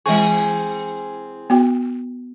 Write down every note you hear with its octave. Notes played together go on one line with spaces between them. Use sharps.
E3 G#3 C4 G#4 C#6
B3 F#4 G5